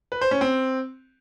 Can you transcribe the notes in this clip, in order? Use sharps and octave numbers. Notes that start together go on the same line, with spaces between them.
B4
C5
C#4
C4